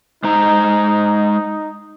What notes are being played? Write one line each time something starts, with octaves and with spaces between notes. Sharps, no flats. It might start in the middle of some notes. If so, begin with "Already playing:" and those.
G#3 D#4 C5 A#5